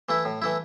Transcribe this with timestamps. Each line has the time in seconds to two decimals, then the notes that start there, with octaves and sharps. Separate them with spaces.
0.09 E3 A3 E4
0.25 A2
0.42 E3 A3 E4